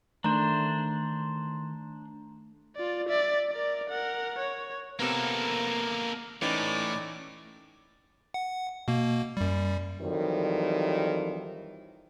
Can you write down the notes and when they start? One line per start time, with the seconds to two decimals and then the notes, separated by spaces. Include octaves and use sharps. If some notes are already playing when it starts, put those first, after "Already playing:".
0.24 D#3 A3 D4 C5 A#5
2.76 F4 D5
3.08 D5 E5
3.50 A#4 D5
3.89 A#4 F#5
4.39 C#5
4.99 C3 A#3 B3 A4 A#4
6.42 A2 E3 C#4 D#4 D5 D6
8.34 F#5
8.88 B2 A#3
9.37 F#2 G3
10.01 F2 D#3 E3 F#3 G3